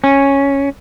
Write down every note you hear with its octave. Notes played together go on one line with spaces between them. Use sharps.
C#4